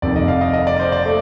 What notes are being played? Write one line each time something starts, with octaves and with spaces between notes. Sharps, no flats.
F1 F2 C3 D#3 D5
D#5
F5
D#5
D#5
D5
C5
D5
A3